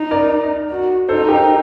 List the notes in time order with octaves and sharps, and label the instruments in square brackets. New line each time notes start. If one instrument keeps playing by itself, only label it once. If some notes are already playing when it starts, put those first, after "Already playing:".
Already playing: [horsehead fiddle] D#4
[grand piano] A#4 D5
[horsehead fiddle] F#4
[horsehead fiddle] D#4 [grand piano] A4 C5
[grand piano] G4 A#4